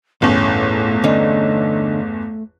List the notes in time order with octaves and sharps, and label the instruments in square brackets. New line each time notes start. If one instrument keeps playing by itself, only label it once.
[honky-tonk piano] G1 E2 [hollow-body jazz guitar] A2 C#4 [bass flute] A3
[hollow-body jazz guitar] D3 C#4 D#4